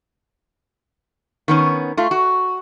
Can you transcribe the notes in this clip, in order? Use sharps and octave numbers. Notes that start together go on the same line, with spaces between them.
D#3 B3 C#4
A3 F4
F#4